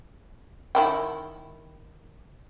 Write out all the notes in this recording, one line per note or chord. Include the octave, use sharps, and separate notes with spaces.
D#3 E4 G5